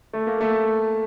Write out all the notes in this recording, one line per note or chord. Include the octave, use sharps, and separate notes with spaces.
A3
A#3
A3